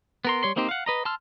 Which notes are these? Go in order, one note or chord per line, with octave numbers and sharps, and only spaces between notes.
B3 A#4 C6
G3 C#5 C6
A#3 C4 D#4 G4 C5
F5 F#5
B4 D#5 A#5
A5 C6 E6 F6